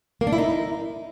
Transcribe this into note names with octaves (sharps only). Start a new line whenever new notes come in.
A#3
D4
E4
D#4